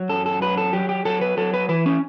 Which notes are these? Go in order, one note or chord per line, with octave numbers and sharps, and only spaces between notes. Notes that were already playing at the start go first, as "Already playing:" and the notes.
Already playing: F#3
F#2 A4
A4
F#3 B4
A4
F#3 G4
G4
F#3 A4
B4
F#3 A4
B4
E3 B4
C#4